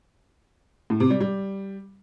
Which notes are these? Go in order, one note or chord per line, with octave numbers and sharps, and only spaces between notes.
A2
C3
G3
G3